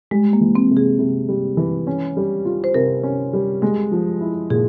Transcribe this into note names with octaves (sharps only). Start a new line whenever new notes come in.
G3 G#3
A#3
E3
C4
C3
G#4
C3
G3
E3
C#4
G3
F4
C5
C3 A#4
C#4
G3
G#3
F3
E4
A#2 G#4